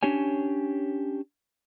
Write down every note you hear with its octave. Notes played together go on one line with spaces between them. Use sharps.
C#4 D4 G4 C#5 G#5